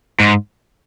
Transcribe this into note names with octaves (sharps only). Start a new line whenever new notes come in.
G#2